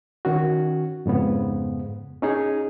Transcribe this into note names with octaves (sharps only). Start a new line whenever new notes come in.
D#3 C#4 F#4
F2 G#2 C#3 B3
C#4 D#4 G#4